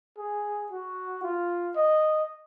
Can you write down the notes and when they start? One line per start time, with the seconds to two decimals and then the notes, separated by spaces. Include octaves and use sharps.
0.18 G#4
0.72 F#4
1.23 F4
1.76 D#5